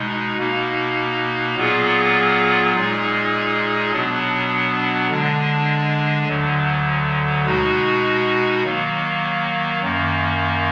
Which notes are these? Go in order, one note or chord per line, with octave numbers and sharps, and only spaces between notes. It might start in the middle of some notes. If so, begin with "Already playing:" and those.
Already playing: B2 G#3 D#4
B2 A#3 D#4
A#2 F#3 B3 F4 G#4
A#2 G#3 D#4 G#4
B2 F#3 B3 D4
D3 G#3 D4
D2 D3 F#3
B2 G#3 D#4 F#4
D#3 F#3 A#3
F#2 D#3 A#3